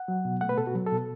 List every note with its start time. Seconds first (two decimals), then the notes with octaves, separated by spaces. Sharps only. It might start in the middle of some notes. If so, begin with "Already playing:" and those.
Already playing: F#5
0.08 F#3
0.25 B2
0.41 A3 F#5
0.49 B4
0.58 B2 A4
0.67 F#4
0.75 F#3
0.86 A4
0.92 B2